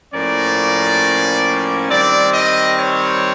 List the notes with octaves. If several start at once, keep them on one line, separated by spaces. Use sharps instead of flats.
A2 F3 A#3 C#4 D5
D#3 G3 C4 D5
D#5
C#5